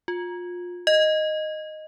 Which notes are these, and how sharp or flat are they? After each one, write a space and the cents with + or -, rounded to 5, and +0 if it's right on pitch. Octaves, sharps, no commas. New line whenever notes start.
F4 +25
D#5 -5